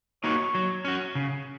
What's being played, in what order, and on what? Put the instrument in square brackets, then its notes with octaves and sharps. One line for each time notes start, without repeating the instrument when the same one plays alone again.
[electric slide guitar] A#3 D#4 F#4 [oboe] C#5
[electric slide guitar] F#3
C#4 F#4
C#3